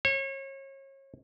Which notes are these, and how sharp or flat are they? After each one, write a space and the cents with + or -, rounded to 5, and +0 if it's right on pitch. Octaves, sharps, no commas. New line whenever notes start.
C#5 -35